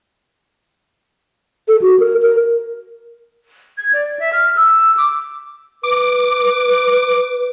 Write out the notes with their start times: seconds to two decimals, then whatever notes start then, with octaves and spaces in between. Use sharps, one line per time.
1.68 A4
1.82 F#4
1.99 A#4
2.22 A#4
3.77 G#6
3.93 D5
4.19 E5
4.33 F6
4.57 E6
4.97 D6
5.83 B4 D6